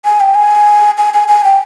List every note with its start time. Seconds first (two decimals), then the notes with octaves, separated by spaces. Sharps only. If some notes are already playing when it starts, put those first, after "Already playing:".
0.05 G#5
0.20 G5
0.35 G#5
0.98 G#5
1.14 G#5
1.28 G#5
1.44 G5